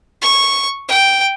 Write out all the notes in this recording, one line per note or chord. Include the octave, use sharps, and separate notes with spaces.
C#6
G5